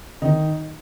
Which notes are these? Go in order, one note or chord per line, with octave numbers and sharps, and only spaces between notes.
D#3 D#4